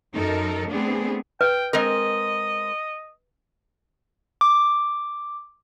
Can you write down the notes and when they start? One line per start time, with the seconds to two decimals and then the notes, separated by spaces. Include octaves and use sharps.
0.14 F#2 D#4 A4 A#4
0.70 A3 B3 C4 D4 G#4
1.41 B4 G5
1.73 G#3 C4 A#4 D#5
4.41 D6